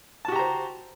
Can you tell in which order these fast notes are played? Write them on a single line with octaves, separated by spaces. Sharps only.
A5 F#4 G4 A#5 C5